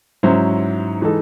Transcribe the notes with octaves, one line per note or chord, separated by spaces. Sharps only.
G#2 F#3 C#4 E4 C5
E3 G#3 D#4 A4